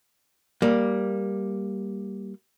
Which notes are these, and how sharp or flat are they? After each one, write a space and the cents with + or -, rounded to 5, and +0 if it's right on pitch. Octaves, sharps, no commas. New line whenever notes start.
G3 +0 A#3 +5